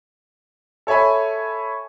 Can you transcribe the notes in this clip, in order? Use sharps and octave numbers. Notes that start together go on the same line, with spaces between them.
A4 C#5 E5 G#5 B5